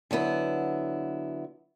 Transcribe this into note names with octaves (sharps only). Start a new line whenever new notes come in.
D3 F#3 B3 E4